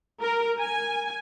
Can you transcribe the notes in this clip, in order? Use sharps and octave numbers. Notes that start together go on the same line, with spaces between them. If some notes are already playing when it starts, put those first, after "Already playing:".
A#4
G#5